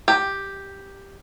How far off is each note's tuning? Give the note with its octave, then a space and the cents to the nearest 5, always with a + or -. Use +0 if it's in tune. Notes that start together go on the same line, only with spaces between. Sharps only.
G4 +5